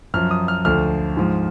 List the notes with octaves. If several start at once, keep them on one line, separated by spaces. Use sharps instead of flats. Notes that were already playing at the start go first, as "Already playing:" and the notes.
F#2 F3 F6
D#6
F6
D2 D3 F3 F6
G#2 F3